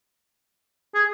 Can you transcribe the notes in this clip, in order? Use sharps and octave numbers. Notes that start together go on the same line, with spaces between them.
G#4